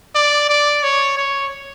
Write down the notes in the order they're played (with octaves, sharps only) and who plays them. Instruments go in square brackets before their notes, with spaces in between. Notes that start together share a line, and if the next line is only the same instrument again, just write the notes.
[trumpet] D5
D5
C#5
C#5